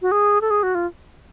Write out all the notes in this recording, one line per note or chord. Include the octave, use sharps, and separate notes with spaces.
F#4
G#4
A4
G#4
F#4
F4